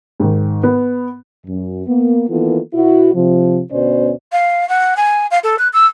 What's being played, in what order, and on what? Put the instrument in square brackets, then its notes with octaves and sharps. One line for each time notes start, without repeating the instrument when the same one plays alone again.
[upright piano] G#2 D#3
B3
[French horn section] F#2
A#3 B3
D#3 E3 A#3 B3 F4 A4
B2 E4 F#4
C3 F3
D2 B2 B3 C#4 C5 D5
[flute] F5
F#5
G#5
F5
A4
F#6
E6